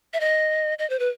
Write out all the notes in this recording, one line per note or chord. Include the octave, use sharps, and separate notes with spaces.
E5
D#5
D#5
C5
B4